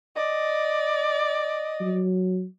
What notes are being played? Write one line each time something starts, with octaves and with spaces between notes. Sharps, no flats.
D5 D#5
F#3